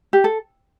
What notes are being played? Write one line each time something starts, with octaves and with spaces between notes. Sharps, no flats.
G4
A4